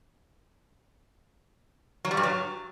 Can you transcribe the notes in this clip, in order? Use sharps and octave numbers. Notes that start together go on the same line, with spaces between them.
F#3
G3
G2
F#3